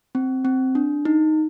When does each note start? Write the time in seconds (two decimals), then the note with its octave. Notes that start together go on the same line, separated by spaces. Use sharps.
0.15 C4
0.45 C4
0.75 D4
1.05 D#4